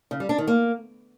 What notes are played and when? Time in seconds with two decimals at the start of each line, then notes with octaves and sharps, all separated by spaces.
0.11 C#3
0.20 G3
0.29 D4
0.38 D#3
0.47 A#3